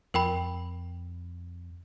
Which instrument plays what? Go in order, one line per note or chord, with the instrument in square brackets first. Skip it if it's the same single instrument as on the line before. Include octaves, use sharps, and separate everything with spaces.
[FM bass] F2 [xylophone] A#4 G5 B5